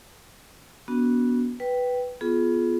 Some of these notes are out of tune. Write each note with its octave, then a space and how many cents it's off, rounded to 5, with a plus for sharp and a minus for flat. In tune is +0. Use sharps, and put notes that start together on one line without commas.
B3 -20 D4 -40 F#4 +0
B4 +0 G5 -10
B3 +0 F4 +0 G#4 +30